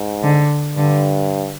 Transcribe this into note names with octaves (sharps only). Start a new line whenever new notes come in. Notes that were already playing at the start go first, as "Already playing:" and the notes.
Already playing: G#2
D3
G2 D3